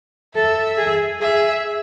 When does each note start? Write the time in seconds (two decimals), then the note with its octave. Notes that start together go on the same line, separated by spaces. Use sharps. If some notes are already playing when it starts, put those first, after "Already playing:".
0.35 A4 E5
0.78 G#4
1.21 G#4 E5